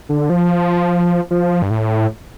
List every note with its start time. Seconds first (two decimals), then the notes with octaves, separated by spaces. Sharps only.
0.09 D3
0.30 F3
1.31 F3
1.62 G2
1.70 A2